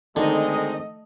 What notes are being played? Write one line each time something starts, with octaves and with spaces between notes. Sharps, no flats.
D3 D#3 G#3 A3 C4 D#4 A4 D#5